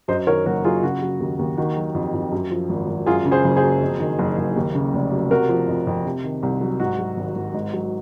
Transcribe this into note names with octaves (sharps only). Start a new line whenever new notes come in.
F#2 C5 D#5
D#3 A#4 C#5
F#1 F#4 A#4
F#3 F4 G#4
C#3 F#4
F#3
D#2
D#2
D#3 F#4
F#3
F2
F2
F#2
F3
G#1
G#1
F#2 F4 G#4
C#3
G#4 C5
F#1
G#4 C5
F#3
F2
D#3
F#1
F#1
D#2
C#3
F1
F#3
C3 F#4 A#4
F3
F2
F2
C3
D#3
C2
F#3
G#2 F#4
F#3
G#1
G#1
G#2
F#3